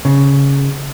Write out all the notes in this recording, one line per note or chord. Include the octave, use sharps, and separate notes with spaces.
C#3